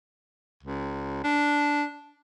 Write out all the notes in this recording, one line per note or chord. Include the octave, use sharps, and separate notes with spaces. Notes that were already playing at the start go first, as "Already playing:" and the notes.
C#2
D4